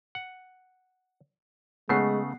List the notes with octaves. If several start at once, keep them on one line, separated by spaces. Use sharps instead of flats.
F#5
C#3 G#3 A3 B3 F#5 C7